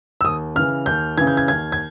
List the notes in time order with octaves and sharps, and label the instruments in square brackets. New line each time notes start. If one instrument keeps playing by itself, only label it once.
[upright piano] E6
D#2 D#6
C#3 E3 F6
D#2 G6
C#3 E3 G#6
G6
G#6
D#2 G#6
G#6